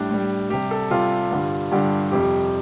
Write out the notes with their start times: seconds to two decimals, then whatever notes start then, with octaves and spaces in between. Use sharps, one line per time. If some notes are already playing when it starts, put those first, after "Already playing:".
Already playing: A2 G3 D4
0.10 A2 G3
0.50 C3 G3 G4
0.71 A4
0.91 C3 G3 F4
1.31 G2 D3 G3
1.71 G2 D3 G3 G4
2.11 F2 C3 G3 G4